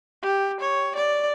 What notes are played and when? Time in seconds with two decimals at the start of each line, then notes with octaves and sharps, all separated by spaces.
0.22 G4
0.60 C#5
0.95 D5